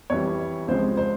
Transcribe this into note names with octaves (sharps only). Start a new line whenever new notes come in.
F2 E3 G3 C#5
C#2 C3 F3 G#3 C5
C5